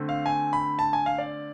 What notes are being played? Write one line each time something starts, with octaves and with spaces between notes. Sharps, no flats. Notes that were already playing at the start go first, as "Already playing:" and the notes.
Already playing: D3 A3 C4
F5
G#5
B5
A5
G#5
F5
D5